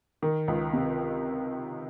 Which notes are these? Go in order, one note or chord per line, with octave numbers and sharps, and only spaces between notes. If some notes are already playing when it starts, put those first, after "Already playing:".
D#3
C#2
C3